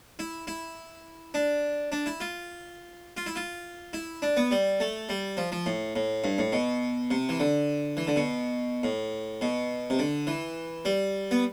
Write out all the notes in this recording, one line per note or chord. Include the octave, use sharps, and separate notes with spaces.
E4
E4
D4
D4
E4
F4
F4
E4
F4
E4
D4
B3
G3
A3
G3
F3
F3
A2
A2
G2
A2
B2
C3
E3
D3
E3
D3
B2
A2
B2
C3
D3
E3
G3
B3